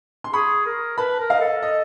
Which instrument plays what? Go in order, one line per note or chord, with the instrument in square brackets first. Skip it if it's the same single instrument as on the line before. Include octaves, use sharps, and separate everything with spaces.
[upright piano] C6
[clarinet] G#4 [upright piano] B5 C#6
[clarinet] A#4
[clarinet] B4 [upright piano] A5 B5
[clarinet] A#4
[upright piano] D#5 F5
[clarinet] A4
[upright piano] D#5